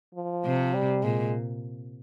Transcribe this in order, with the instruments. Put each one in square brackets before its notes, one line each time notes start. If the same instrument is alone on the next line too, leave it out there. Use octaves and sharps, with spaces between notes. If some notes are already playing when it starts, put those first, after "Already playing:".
[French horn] F3
[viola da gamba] C3
[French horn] G3
[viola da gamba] A#2 [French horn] G#3